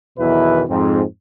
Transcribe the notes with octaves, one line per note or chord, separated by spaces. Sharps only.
B1 E2 B2 D#3 E4 B4
F2 G#2 C4